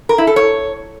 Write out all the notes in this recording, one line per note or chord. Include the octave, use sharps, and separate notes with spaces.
A#4
E4
A4
C#5